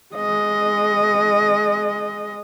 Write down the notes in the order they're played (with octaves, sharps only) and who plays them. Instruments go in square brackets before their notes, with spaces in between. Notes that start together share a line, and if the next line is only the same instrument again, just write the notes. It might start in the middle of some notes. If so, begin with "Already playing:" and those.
[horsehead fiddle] G#3 D#5